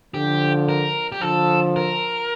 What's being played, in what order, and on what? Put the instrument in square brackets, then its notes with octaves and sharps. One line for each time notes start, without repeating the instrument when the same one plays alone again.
[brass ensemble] D3 F3 [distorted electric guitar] G4
[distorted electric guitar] A#4
G4
[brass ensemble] D3 F3 [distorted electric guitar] A4
[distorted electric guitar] A#4